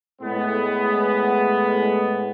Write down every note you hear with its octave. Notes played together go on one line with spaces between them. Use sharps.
A2 G#3 B3